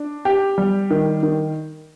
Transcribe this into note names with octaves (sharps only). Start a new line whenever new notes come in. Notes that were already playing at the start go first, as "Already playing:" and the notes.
Already playing: D4
G4
G3
D#3
D#3